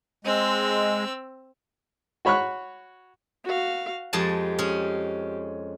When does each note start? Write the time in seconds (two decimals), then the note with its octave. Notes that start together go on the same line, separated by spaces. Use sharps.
0.25 G#3 C4 E6
2.25 F#4 C#5 B5 C#6 F#6
3.44 F#4 F5
4.13 F2 G#3 G4 A5
4.58 G#3 C#4